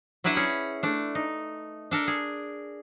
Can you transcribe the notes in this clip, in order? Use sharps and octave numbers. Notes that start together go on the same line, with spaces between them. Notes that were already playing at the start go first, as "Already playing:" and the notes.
F#3 D4 E4 B4 E5 F#5
C#4 G#4 C#5
A3 D4
D#4
D4 A4 A#4
G#4